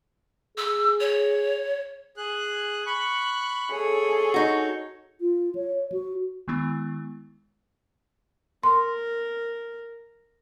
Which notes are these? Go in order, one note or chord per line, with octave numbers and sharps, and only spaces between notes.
G#4 E6
C#5
G#4 F#6
B5 C#6 F#6
G#4 A4 C#5
D#4 F#4
F4
C#5
F#4
D#3 G#3 B3 E4
A#4 C6